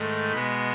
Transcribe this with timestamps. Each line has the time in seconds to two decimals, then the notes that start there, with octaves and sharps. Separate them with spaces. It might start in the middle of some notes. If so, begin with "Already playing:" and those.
Already playing: G#2 D#3 A3
0.32 B2 G#3 B3 B5